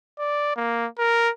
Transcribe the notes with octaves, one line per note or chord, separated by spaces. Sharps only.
D5
A#3
A#4